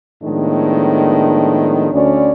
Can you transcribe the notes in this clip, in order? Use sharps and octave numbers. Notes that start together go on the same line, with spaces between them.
A2 D#3 F3 G#3 B3 D4
D2 C#4 D5